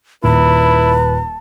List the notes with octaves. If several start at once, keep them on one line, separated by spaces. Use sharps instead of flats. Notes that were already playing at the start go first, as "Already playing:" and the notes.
D#1 E4 B4 A5